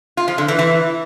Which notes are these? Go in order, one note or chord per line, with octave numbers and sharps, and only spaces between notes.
F4
F3
D3
E3
E3